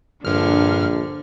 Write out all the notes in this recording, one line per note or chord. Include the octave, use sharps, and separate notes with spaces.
A#1 G2 D3 F6